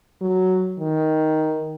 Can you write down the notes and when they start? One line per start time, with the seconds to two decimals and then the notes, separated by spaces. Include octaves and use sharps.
0.21 F#3
0.79 D#3